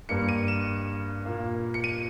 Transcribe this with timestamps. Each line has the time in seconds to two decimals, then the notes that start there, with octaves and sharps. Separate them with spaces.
0.09 G2 G3 A#3 C#7
0.29 D#7
0.48 E7
1.26 A#2 A#3
1.74 C#7
1.84 D#7